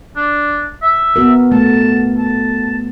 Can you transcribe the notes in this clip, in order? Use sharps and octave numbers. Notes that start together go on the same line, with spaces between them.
D4
E5
B3 F#4 A#4
A3 A5
A5